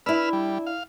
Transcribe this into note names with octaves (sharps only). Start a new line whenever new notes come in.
D4 E4 B4 E6 F6
G3
F5